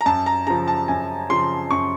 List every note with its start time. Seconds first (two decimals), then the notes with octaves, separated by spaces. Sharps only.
0.01 A#5
0.06 F#2 A5
0.26 A#5
0.47 C#3 F3 A#5
0.68 A5
0.88 F#2 G#5
1.30 C#3 F3 C6
1.71 F#2 C#6